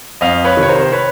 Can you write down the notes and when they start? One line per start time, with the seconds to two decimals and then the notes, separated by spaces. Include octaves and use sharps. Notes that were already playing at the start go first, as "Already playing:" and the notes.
0.21 F2 D#5 F5
0.45 B4 C#5
0.57 C3 D#3
0.63 C#5
0.68 A#4 C5
0.81 C5
0.92 B4 C#5